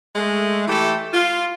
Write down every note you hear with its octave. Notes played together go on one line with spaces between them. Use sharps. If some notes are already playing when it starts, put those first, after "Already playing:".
G#3 A3
E3 A3 G4 A4
F4